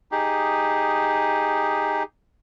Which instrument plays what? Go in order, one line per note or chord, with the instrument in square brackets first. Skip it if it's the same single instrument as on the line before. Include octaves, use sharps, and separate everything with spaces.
[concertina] D#4 G4 G#4